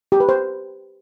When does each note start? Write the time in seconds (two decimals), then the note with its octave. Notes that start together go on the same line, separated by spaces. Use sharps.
0.12 G4
0.20 B4
0.29 C5